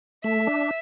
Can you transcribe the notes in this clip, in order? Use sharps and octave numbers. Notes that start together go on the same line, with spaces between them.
A3 E5
D4